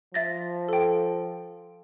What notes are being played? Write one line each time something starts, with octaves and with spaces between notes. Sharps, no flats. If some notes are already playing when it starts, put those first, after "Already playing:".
F3 E5 A6 A#6
A4 G5